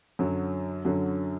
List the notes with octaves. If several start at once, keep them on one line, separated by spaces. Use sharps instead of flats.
F#2 D3 F#3
F#2 D3 F#3